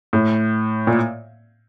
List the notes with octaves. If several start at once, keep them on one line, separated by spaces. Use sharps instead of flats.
A2
A#2